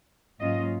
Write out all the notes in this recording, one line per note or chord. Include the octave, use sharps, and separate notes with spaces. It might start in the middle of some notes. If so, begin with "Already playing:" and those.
G#2 F#3 A#3 C#4 F4 D#5